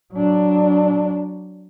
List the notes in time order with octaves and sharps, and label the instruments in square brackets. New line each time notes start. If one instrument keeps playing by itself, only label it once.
[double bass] F#3 D4